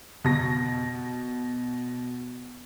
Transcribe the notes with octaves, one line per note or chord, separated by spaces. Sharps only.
B2 A#6